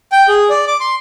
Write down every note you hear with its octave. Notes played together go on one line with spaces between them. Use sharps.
G5
G#4
D5
D6
C6